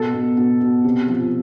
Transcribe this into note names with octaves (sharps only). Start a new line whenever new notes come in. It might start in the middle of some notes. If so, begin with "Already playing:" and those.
Already playing: B2 A4
B2
B2
B2
C3
F3